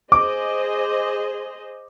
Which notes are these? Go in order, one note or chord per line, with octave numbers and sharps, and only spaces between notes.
G#4 C5 D#5 D6